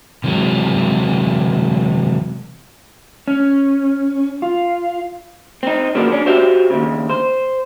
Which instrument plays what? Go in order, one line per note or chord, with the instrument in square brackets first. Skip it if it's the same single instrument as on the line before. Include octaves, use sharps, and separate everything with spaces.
[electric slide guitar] C3 E3 F#3 G#3
C#4
F4
[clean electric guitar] C4 D#4
C#3 F3 F#3 A#3 B3 D4
C#4 D4
F#4 G4 C5 E5 F5 G5
D#2 C#3
C5